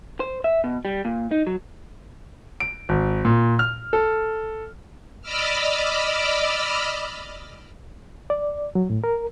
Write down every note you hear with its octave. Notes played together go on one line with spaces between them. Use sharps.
C5
E5
B2
G3
A#2
D#4
F#3
D7
G#1
A#2
F6
A4
D5 D#5 B5 D6 E6 F6
D5
F#3
A2
A#4